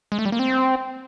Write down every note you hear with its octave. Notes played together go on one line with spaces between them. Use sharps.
G#3
A3
G3
A#3
C4